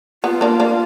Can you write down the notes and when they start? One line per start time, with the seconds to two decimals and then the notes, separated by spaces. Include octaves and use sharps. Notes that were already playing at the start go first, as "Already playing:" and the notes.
0.24 B3 F4
0.41 A#3 D4
0.60 A#3 D4